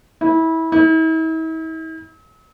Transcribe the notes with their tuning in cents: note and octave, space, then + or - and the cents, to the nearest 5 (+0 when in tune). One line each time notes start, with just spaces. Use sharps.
E4 -25
E4 -45